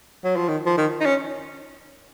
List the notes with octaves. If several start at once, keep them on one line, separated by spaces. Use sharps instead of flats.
F#3
F3
D#3
F3
D#3
D#4
C#4